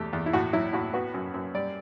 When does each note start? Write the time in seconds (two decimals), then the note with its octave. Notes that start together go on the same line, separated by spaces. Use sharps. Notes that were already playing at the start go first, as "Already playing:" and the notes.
Already playing: E2 A3 G4
0.13 E2
0.26 E4
0.33 A2 F#4
0.53 F#3 E4
0.73 A2 F#4
0.93 B3 F#4
1.14 F#2
1.34 F#2
1.54 G3 D5